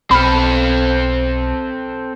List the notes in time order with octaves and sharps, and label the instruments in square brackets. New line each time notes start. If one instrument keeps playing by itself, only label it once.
[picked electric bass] B1 [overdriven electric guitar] C4 A4 [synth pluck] B5 F6